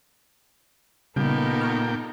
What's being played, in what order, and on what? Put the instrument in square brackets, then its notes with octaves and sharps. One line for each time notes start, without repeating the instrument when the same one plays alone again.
[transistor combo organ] A#2 G5 [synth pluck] C#3 G3 [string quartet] B3 D#4 A4
[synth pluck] F#5 C#6 F6